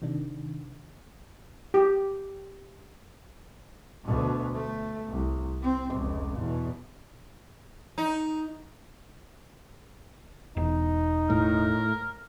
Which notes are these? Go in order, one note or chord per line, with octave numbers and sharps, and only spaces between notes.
C3 D#3 D4
G4
D2 B2
A3
C2
C4
F1 C#2
E2 B2
D#4
E1 D#4
A2 A#4